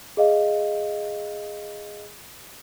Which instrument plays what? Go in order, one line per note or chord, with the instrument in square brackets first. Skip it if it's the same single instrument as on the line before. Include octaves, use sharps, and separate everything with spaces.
[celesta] G#4 D#5 F5